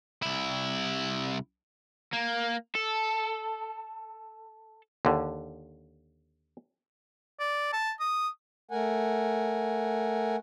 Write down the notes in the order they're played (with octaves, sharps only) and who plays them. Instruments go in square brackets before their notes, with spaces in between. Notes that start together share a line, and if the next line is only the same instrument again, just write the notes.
[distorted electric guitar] C2 E4
[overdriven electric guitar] A#3
A4
[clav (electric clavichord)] D#2 D3
[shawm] D5
A5
D#6
[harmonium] A3 A#4 F#5 G#5